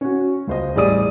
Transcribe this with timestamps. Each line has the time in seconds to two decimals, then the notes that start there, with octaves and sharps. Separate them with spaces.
0.01 C#4 F#4
0.47 C#2 C5 D#5
0.75 A1 G3 G#4 D5 D#6 D#7